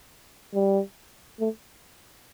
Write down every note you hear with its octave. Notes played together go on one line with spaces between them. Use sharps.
G3
A3